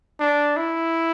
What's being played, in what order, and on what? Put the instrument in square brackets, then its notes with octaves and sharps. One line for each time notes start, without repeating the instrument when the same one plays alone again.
[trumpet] D4
E4